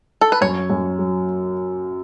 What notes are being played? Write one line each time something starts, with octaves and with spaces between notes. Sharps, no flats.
A4
B4
F#2 C#5
F#2
F#3